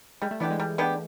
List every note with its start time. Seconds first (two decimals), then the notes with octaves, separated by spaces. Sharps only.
0.22 G3 G#3
0.31 A3
0.40 E3 B3 D4 G4
0.50 G#3
0.60 G3
0.78 B3 D4 G4